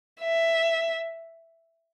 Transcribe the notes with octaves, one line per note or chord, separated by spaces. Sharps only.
E5